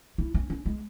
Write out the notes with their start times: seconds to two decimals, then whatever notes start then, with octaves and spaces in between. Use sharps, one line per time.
0.18 E4
0.34 C#4
0.50 C#4
0.66 G#3